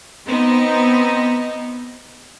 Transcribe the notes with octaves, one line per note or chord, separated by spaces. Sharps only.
B3 C4 D#4